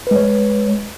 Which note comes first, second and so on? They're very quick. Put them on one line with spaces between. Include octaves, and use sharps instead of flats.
B4 G#3 C#5